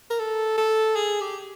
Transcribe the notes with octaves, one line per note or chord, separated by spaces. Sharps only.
A#4
A4
A4
G#4
G4